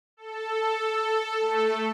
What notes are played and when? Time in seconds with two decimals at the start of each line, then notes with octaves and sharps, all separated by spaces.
0.17 A4
1.41 A3 A4